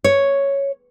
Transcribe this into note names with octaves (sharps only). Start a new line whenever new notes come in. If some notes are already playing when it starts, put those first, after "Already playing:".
C#5